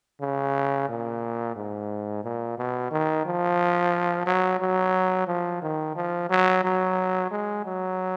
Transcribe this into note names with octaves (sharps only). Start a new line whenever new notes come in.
C#3
A#2
G#2
A#2
B2
D#3
F3
F#3
F#3
F3
D#3
F3
F#3
F#3
G#3
F#3